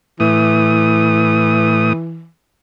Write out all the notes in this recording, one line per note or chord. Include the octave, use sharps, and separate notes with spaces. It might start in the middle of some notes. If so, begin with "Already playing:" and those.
A2 E3 D#6